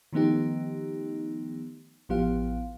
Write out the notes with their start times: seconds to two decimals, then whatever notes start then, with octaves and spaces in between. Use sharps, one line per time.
0.13 D#3 F3 A3 B3 D#4 G4
2.09 A1 F3 B3 G4 F5